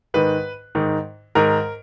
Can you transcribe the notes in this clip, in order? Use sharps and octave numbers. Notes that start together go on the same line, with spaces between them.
G#2 D#3 B4
G#2 D#3
G#2 D#3 A#4